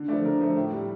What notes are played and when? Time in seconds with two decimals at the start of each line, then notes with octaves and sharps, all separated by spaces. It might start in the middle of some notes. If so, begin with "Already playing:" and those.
Already playing: D3
0.08 A3 D5
0.13 F3
0.25 D3 A#4
0.41 F3 A3
0.57 A2
0.72 G3